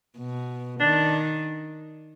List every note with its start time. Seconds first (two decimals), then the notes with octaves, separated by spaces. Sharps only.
0.17 B2
0.80 D#3 D4